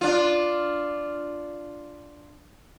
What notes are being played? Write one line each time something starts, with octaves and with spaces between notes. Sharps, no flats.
D4 F4